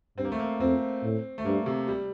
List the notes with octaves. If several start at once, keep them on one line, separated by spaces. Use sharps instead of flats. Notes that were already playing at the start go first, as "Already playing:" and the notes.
G2 C4
A#3
A3
A#3
F2 C4
A2
A3
G2 A#3
C3
G3